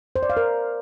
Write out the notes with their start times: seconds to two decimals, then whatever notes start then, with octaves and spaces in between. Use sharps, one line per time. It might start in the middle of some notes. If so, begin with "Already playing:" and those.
0.16 C5
0.23 D5
0.30 F5
0.37 A#4